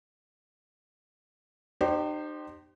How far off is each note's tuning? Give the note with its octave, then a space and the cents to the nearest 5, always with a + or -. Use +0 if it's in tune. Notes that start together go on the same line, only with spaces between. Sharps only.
D#4 -45 G4 -20 C5 +0